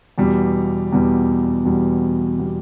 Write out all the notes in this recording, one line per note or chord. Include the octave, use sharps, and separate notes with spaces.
E2 B2 G3
E2 B2 G3
E2 B2 G3
B2 G3